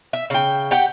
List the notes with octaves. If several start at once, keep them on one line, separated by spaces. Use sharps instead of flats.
E5
C#3 G5
G4 F#5 G5